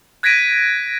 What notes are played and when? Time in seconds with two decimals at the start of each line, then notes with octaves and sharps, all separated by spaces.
0.23 F#6 G#6 A#6 B6 D7 D#7